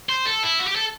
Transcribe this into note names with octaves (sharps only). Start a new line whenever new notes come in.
C5
A4
E4
F#4
G4
A4